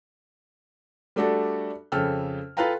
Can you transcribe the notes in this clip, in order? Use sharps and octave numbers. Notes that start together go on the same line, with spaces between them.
G3 A3 D4 F#4 A4
F2 C#3 A4 G5 E6 F6
F4 A4 B4 F5 G5 A#5